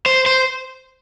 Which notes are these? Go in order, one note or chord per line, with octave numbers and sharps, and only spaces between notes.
C5
C5